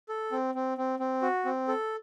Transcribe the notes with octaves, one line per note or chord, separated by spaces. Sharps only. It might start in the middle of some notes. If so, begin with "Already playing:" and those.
A4
C4
C4
C4
C4
F#4
C4
A4